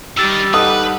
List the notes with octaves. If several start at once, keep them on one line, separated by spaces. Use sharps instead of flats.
D#3 G3 G4 E6 A6
D#4 A4 B4 F#5 D#6